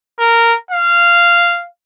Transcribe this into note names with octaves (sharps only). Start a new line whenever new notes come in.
A#4
F5